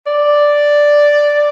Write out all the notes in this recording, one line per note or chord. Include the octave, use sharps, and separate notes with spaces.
D5